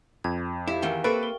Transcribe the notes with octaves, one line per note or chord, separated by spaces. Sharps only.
F2 G#6
E4 G4 E5 F5
E2 D#3 E3 A#4 F5
A#3 C4 A4 B4 G5 C#6 A6
A#4